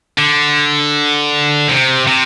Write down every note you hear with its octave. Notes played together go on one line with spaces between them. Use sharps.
D3
C3
C3